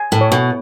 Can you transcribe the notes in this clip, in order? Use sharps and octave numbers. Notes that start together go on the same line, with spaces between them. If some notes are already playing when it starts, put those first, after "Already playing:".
Already playing: G#5
A2
C#5
B2